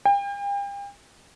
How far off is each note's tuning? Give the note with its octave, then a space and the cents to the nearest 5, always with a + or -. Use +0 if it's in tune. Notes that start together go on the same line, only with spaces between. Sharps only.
G5 +40